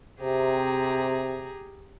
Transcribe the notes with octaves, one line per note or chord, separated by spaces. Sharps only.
C3 G4 G#4 A#5